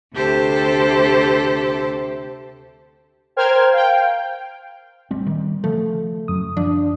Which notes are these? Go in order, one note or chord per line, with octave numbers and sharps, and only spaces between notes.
D2 C3 G4 A4 C5
A#4 C5 G5 F6 G#6
F5 G5
A1 G3 C4
D#3 G3
C#3 F3 A3
F#2 D#6
F3 D4